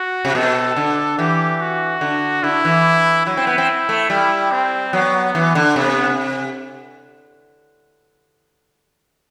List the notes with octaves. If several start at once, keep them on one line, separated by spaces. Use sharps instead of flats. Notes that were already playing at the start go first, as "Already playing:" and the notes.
Already playing: F#4
C3
B2 A4
D3
E3 G4
F#4
D3
D3 E4
E3
F#3 E4
C4
B3
C4
A3
G3 E4
C4
F#3 B3
E3
D3
C3 B3